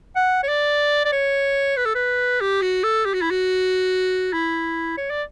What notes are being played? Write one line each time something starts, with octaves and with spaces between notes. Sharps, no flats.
F#5
C#5
D5
D5
C#5
B4
A4
B4
G4
F#4
A4
G4
F#4
E4
F#4
E4
C#5
D5